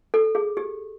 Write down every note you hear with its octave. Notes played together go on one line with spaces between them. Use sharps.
A4
G#4
G4